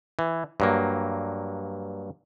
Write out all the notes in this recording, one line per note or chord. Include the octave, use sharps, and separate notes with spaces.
E3
G2 F#3 A#3